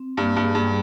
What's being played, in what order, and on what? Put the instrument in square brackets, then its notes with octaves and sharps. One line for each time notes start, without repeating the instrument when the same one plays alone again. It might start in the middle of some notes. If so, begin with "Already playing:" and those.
Already playing: [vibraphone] C4
[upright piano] G2 [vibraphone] A#3
[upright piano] G2
[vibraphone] G#4
[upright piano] G2
[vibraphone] G3